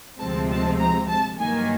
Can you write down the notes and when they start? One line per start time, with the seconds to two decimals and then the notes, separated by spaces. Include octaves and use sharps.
0.19 D2 C3 F3 G#3 C4 A5
0.50 A5
0.79 A#5
1.09 A5
1.39 G2 D#3 F#3 A#3 G#5